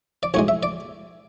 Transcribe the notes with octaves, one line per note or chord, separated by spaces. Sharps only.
D5
B1 A2 G#3 C#5
E5
D5